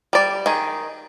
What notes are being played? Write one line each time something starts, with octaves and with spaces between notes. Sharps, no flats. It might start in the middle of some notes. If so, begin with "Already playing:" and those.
G3 D5
D#3 G#4